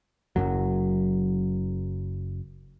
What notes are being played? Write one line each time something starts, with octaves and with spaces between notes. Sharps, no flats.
F#1 C2 F#2 F#3